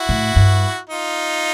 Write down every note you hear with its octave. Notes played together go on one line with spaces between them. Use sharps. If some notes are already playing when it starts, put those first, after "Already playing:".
Already playing: E4 F#4
A2
G2
D#4 F4